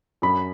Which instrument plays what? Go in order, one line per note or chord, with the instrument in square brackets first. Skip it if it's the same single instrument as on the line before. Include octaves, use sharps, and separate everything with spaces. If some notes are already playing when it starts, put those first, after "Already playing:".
[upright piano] F#2 B5